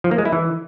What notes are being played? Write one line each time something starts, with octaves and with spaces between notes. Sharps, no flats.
F3
A#3
G#3
E4
E3